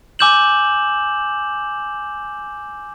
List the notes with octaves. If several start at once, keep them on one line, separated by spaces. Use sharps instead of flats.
G#5 D6 E6 G6 E7 F#7